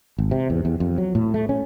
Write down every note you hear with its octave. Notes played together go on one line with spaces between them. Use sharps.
G#1
C3
E2
E2
F2
F#3
A2
A3
C#4